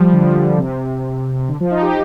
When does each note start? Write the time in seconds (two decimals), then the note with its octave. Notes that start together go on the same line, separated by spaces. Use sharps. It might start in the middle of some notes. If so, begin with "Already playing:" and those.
Already playing: F3 G3
0.13 D3
0.58 C3
1.49 D3
1.60 F3
1.71 D#4
1.82 G4